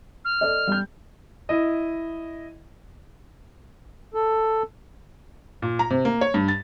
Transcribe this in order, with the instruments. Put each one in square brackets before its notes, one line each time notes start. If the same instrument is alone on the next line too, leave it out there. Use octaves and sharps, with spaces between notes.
[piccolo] F6
[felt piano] A4 D5 D#5
G3 G6
[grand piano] E4 D#5
[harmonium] A4
[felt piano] A#2
A#5
C3
A#3
C#5
G2
A6